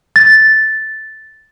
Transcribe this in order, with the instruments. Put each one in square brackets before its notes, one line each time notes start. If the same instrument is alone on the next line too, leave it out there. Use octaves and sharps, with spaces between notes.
[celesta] A6